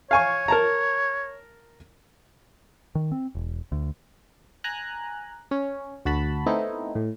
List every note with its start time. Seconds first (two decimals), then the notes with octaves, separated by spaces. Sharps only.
0.11 C#5 F5 G#5 C#6
0.48 A#4 A5 A#5
2.95 D#3
3.12 C4
3.35 E1
3.72 D2
4.64 G#5 A#5 F#6
5.51 C#4
6.05 D2 F#4 A5 B5
6.46 A3 B3 C4 D#4 E4
6.95 A2